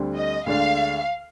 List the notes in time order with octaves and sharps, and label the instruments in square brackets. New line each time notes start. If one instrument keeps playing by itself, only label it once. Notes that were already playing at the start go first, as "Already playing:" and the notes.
Already playing: [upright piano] D2 D3 G3 C4
[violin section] D#5
[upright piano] D2 D3 G#3 D4 [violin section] F5